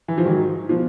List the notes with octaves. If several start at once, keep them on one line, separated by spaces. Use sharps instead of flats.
E3
F3
G#2 D#3 F#3
B2 F3